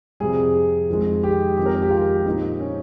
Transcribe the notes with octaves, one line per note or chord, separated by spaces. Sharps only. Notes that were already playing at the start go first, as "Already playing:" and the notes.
F2 C3 G3 G#4
F2 D#3 G#3
G4
F2 D#3 G#3 G4
A#4
G4
F4
G4
A#2 F3 A#3 D#4
C#4